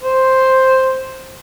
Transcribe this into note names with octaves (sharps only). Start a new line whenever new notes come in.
C5